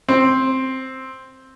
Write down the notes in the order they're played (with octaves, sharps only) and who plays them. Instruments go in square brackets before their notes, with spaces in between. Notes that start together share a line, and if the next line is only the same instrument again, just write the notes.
[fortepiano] C4